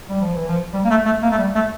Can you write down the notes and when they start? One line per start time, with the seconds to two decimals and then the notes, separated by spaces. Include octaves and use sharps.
0.09 G3
0.21 F3
0.35 E3
0.48 F3
0.73 G3
0.84 A#3
0.90 A3
1.06 A3
1.22 A#3
1.31 A3
1.38 G3
1.55 A3